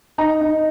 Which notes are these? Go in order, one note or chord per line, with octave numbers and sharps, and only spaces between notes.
D#4 A#5
D#4